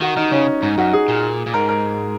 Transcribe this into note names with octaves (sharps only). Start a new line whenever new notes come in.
D#3 F#4
D#3 D#4
C#3 C#4
G#2 D#4
F#2 F#4
G#4
A#2
A#2
G#2 A#4
A#4